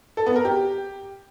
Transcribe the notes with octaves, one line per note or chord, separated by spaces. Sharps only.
A4
B3
A#4
G4